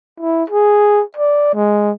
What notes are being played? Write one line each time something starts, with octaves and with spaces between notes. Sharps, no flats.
E4
G#4
D5
G#3